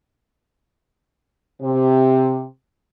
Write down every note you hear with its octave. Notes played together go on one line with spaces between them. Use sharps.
C3